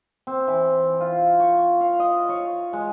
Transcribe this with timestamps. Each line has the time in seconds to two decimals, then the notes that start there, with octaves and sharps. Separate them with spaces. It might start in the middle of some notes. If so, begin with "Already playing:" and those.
0.27 C4
0.47 E3
1.01 F4
1.40 C#6
1.81 F5
2.00 D#5
2.29 C#5
2.73 G#3